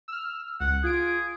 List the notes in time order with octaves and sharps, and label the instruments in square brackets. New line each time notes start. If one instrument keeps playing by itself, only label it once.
[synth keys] E6 F6
[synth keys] C#2 [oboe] F#5
[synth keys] F4 D7 [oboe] G#4